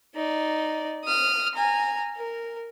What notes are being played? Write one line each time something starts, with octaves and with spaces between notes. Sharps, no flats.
D#4 D5
D#6 F6
G#5 A#5
A#4